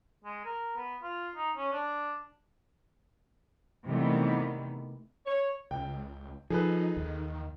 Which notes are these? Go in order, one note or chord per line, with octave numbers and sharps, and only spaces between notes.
G#3
A#4
B3
F4
D#4
C#4
D4
C3 D#3 E3 G3 A3 B3
C#5
C#2 G5
F3 D#4 G#4 A4 B4
D#2 D#3